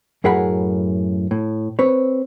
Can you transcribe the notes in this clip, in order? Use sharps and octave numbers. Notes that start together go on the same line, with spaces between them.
F#2 A2 G#4 A#4 F#5 B5
A2
C4 B4 C#5